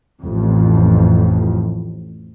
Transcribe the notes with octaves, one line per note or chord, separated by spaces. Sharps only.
A1 F2